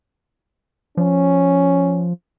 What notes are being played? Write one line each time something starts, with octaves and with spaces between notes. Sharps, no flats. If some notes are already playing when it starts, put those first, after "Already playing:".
F3 C#4